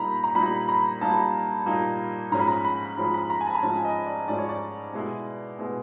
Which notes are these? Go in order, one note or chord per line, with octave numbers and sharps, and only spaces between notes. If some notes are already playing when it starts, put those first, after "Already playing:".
Already playing: A#2 G3 A#3 D#4 A#5 B5
A#5
A#2 G3 A#3 D#4 B5
A#5
A#2 G3 A#3 D#4 A5
A#2 G3 A#3 D#4
G#2 F3 G#3 C#4 A#5
B5
A#5
B5
G#2 F3 G#3 C#4
B5
A#5
G#5
A5
A#5
G#2 F3 G#3 C#4 A5
D#5
D5
G#2 F3 G#3 C#4 D5
C#5
D5
B2 G#3 B3 E4
B2 G#3 B3 E4